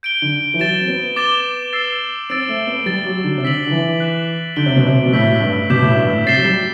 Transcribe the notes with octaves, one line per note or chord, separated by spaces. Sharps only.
G6 D7 G7
D3
E3
F#3 A6 E7 G7
C4
B3
D6 A6 E7 G7
E6 A6 C7
C4 E6 A6 D7 F#7
A3
B3
G3 A6 D7 G7
F#3
D3
C3
D3 E6 B6 D7 F#7
D3
E3
F#6 B6 E7
D3 G6 D7 G7
C3
B2
C3
B2
A2 E6 G6 B6 F#7
G2
B2 D6 G6 B6 E7
A2
G2
A2
C3 A6 C7 E7 G7
F#3
G3